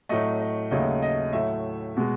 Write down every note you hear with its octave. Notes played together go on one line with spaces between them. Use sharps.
A2 F#3 A3 D#5
D#5
D#2 C#3 F#3 A3 D#5
D#5
A2 F#3 A3 E5
B2 G#3